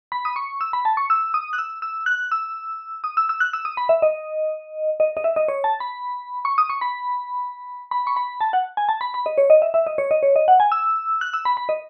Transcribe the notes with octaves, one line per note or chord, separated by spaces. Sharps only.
B5
D#6
C#6
E6
B5
A5
C#6
E6
D#6
F#6
E6
E6
F#6
E6
D#6
E6
E6
F#6
E6
D#6
B5
E5
D#5
D#5
D#5
E5
D#5
C#5
A5
B5
C#6
D#6
C#6
B5
B5
C#6
B5
A5
F#5
G#5
A5
B5
B5
D#5
C#5
D#5
E5
E5
D#5
C#5
D#5
C#5
D#5
F#5
G#5
E6
F#6
E6
B5
B5
D#5